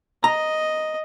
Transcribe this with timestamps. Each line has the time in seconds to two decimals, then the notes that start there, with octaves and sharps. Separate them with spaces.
0.24 D#5 A#5